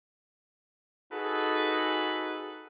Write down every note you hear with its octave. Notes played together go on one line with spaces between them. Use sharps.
D#4 F#4 G#4 A4 B4